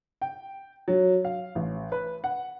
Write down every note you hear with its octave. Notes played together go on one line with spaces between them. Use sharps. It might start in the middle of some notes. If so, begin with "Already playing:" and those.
G5
F#3
F5
A1
B4
F#5